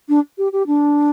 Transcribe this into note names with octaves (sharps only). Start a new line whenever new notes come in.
D4
G4
G4
D4